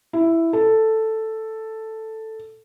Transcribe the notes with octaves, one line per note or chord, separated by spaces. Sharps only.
E4
A4